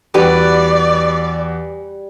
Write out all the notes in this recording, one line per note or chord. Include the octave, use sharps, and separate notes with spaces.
E2 G3 F#4 G4 B4 D5